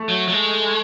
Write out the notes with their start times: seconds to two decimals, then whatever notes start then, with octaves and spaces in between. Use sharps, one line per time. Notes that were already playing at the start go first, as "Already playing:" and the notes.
Already playing: A3
0.09 F#3
0.28 F#3
0.32 G#3